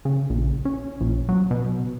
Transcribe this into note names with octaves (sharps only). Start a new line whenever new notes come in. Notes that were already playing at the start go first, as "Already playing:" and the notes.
C#3
A#1
C#4
A#1
F#3
B2